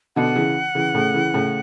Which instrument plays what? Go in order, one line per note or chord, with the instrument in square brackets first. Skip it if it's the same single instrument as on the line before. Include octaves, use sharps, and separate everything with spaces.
[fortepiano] B2 D3 [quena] F#5
[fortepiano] C#3 E3
C#3 E3
A2 C#3
C#3 E3
A2 C#3